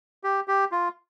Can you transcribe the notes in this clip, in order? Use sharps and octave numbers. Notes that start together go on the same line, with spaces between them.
G4
G4
F4